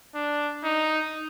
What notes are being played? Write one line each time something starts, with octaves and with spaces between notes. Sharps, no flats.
D4
D#4